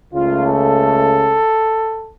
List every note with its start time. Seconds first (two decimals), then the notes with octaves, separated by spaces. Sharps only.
0.13 C#2 C#3 A3 F4
0.45 A4